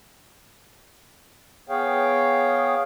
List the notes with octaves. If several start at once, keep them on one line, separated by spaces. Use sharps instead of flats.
B3 G#4 C#5 F5 G5